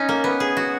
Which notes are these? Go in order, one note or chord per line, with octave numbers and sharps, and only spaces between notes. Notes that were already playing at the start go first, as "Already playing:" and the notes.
Already playing: C#4 D#4
A#3
B3
G#4
F#4